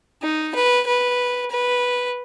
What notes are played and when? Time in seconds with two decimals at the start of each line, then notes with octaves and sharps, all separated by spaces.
0.23 D#4
0.55 B4
0.87 B4
1.50 B4